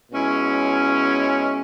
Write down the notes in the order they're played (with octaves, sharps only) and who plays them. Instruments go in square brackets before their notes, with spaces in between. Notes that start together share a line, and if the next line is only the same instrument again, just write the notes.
[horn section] B2 G#3 C#4 E4